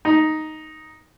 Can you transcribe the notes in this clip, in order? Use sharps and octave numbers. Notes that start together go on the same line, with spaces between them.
D#4